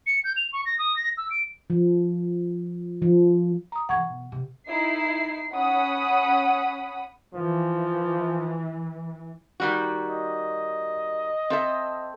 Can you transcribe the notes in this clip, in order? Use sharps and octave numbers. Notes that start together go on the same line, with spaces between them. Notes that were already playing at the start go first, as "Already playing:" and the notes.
C#7
G6
F7
C#6
A#6
D#6
A#6
E6
D7
F3
F3
A#5 D#6
C#3 E3 F#5 C#6 G#6
B2
C3
D#4 E4 C7
C#4 F#5 B5 D#6
E3 F3
D#3 G3 F#4
D#5
C4 A4 E5